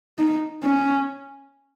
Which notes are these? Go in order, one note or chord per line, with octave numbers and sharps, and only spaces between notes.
D#4
C#4